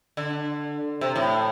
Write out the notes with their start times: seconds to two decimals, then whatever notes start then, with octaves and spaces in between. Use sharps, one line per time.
0.17 D3
1.01 C3
1.16 A2